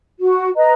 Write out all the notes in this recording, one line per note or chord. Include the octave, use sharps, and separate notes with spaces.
F#4
B4 D#5 A#5